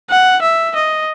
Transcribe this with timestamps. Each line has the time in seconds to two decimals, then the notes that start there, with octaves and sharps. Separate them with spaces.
0.10 F#5
0.42 E5
0.75 D#5